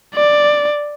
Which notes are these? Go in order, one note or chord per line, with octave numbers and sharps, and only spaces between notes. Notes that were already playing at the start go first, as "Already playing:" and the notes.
D5